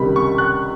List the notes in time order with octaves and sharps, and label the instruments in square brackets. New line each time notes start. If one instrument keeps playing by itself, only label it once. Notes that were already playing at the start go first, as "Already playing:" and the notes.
Already playing: [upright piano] C#2 C3 D#3 G3 B5
C#6
F#6